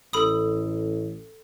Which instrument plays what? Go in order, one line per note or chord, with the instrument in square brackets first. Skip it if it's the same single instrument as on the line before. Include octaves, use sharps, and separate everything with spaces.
[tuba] A1 [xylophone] A4 B5 D#6